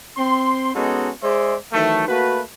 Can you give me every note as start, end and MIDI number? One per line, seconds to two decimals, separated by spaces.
0.17 0.72 60
0.17 0.72 84
0.75 1.09 56
0.75 1.09 59
0.75 1.09 61
0.75 1.09 63
0.75 1.09 66
0.75 1.09 69
1.23 1.55 56
1.23 1.55 68
1.23 1.55 72
1.23 1.55 74
1.23 1.55 76
1.23 1.55 84
1.73 2.06 51
1.73 2.06 52
1.73 2.06 54
1.73 2.06 57
2.07 2.41 57
2.07 2.41 58
2.07 2.41 66
2.07 2.41 71